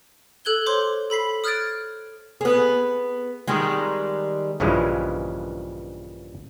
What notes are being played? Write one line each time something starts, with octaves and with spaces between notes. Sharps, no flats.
A4 F#6 G#6 G7
C5 C#5 C6 D6
A4 B5 B6 C7
D#6 F6 F#6 G#6 A6 D7
B3 G#4
D#3 G3 G#3
A#1 G2 C#3 E3 F3 G#3